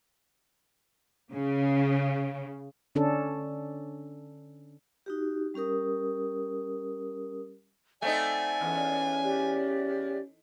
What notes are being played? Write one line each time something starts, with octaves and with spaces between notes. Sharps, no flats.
C#3
D3 C#4 D4 A4
D#4 F#4 G4
G3 C#4 G4 A#4 D#6
A3 C4 D#4 D5 F#5 G#5
E2 C#4
G4 D5